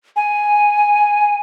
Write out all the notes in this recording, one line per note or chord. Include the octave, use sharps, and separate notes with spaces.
G#5